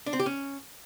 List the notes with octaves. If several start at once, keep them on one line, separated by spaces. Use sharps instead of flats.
D4
C4
G4
C#4